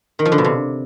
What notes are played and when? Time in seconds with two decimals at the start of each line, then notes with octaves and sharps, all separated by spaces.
0.19 D#3
0.25 F3
0.32 D3
0.38 B2
0.44 C3